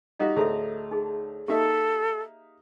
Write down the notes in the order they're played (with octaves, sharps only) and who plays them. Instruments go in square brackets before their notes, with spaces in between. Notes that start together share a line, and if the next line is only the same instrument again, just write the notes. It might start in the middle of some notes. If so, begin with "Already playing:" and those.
[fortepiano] G3 D#4 F#4 [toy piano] D#5 F5
[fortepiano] D2 A2 A#5 [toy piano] G#4 A4 E5
[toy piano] D#4 G#4
[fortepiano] A#3 D#4 E5 [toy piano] G4 [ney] A4